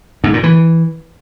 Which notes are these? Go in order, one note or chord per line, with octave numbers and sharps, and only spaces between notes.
G#2
A#2
E3